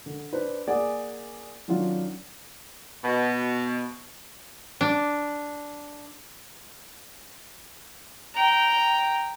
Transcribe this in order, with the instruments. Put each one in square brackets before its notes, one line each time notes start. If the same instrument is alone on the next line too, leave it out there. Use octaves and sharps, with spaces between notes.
[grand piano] D3
D4 B4 C5
A#3 G#4 D5 F#5 G#5
D#3 F#3 C#4 D4 F4
[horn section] B2
[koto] D4
[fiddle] G5 A#5